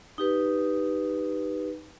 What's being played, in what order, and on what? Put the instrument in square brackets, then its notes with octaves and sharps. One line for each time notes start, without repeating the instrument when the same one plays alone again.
[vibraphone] D#4 G4 B4